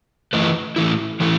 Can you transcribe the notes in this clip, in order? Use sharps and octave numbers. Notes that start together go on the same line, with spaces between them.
E3 A3 E4 B4 D#5
A2 E3 A3 E4
A2 E3 A3 E4